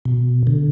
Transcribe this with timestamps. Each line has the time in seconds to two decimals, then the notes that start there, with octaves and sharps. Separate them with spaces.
0.05 B2
0.47 D3